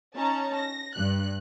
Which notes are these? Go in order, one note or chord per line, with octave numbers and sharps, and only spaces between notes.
C#4 D#4 A5 A#5
A#6
G2 F#6